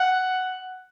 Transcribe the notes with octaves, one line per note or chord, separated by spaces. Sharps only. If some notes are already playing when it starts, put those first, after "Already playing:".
Already playing: F#5